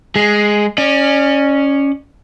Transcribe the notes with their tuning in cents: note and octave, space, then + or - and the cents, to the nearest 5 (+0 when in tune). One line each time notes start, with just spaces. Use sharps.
G#3 +0 G#4 +0
C#4 +0 D5 +35